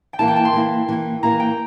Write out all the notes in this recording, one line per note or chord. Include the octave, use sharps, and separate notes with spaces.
G5
E3 A#3 E4 A5
G5
A5
C6
E3 A#3 E4
E3 A#3 E4
E3 A#3 E4 A#5
G5